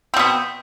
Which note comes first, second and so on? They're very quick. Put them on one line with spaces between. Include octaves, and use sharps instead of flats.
C4 B2 B3